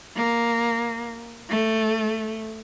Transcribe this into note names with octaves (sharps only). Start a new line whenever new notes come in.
A#3
A3